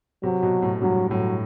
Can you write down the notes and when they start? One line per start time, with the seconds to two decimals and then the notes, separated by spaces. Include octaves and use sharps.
0.23 C3 F#3
0.43 B2
0.62 A2
0.81 G2 F#3
1.10 A2 F#3